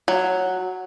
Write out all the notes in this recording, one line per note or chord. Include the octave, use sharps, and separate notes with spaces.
F#3